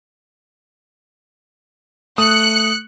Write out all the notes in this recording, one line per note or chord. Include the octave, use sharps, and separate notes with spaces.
A3 D#6 F#6 C#7